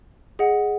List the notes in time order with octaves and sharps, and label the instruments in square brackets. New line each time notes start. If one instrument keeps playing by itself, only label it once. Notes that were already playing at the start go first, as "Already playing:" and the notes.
[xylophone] G#4 D#5 F#5